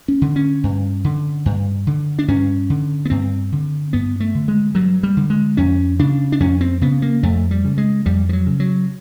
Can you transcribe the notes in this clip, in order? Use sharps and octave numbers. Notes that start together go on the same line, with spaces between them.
C#4
D3
C#4
G2
D3
G2
D3
D4
G2 C#4
D3
B3
G2 C4
D3
G2 B3
A3
D3
G#3
G2 F#3
G3
D3
G#3
F2 C#4
C#3 D4
D4
F2 C#4
C4
C#3 B3
A#3
F2 A3
G3
C#3
G#3
F2 G3
F3
F#3
C#3
F#3